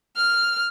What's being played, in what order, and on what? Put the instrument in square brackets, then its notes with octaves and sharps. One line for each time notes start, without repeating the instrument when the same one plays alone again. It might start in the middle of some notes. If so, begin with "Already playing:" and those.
[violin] F6